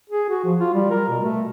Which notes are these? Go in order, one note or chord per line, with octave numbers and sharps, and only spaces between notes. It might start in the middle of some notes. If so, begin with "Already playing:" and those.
G#4
F#4
F3
F4
G3
A#4
B2
A3